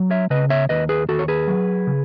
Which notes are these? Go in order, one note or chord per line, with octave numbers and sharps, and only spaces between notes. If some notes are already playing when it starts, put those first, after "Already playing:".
Already playing: F#3
C#5 E5
C#3 B4 D#5
C#5 E5
D#2 B4 D#5
G#4 B4
D#2 F#4 A4
C#5
G#4 B4
F#3
C#3